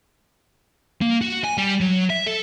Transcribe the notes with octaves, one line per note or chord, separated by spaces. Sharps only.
A#3
F#4
G#5
G3
F#3
E5
A4